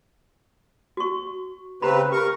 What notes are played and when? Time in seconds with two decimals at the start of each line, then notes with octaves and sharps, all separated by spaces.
0.97 F#4 C#6
1.82 C#3 C4 G4 B4 A#5 B5
2.12 G4 A#4 C#6